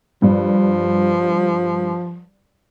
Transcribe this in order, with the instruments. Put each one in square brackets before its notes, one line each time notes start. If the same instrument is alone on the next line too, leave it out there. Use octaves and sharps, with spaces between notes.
[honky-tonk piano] G2 [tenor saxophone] F3